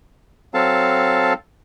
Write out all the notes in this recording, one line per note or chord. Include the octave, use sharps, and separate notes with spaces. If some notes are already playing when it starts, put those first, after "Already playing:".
F#3 C4 A4 F5 A5